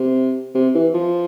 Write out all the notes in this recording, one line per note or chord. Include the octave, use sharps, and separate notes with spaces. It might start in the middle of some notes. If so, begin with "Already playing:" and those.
Already playing: C3
C3
E3
F3